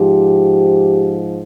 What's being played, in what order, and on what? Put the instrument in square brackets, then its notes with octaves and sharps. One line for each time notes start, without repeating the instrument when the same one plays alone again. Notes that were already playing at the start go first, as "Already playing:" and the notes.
Already playing: [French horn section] G#2 F3 G4